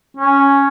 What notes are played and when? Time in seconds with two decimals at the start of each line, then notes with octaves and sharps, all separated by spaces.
0.17 C#4